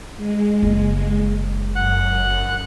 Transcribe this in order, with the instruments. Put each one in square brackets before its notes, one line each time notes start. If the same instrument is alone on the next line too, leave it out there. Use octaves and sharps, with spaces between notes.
[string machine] G#3
[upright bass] F#1
[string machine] F#2 [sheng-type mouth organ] F#5 F#6